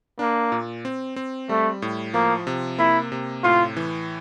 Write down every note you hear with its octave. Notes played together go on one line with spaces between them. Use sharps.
A#3 D4
A#2
C4
C4
G3 A3
A2
F3 A#3
C3
A#3 E4
C3
A2 F4
E3